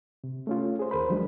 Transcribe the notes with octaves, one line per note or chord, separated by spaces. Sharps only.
C3
A3 C#4 F4
G#4 C5
D#2 A#4 C5 B5
D#3 F3 F#3 G#3 D4